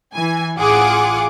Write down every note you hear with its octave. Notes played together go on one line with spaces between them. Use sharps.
E3 G#5
A1 F4 G#4 F#5 D6